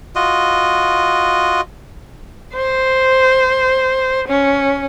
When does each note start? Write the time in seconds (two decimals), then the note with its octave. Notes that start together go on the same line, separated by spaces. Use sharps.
0.16 F4 F#4 D#5
2.54 C5
4.29 C#4